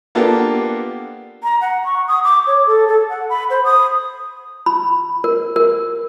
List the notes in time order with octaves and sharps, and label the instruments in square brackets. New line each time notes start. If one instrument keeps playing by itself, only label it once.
[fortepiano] A#3 B3 D4 F4 G4 A4
[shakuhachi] A#5
F#5
C#6
D#6
D6
C#5
A4
A4
F#5
B5
C5
D#6
[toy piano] B5
A#4
A#4